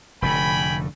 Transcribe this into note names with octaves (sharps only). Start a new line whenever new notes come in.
F1 A2 D3 G5 G#5 B5